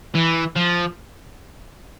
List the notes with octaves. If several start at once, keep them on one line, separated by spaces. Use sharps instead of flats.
E3
F3